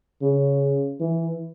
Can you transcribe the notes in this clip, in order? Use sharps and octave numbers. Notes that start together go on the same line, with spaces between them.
C#3
E3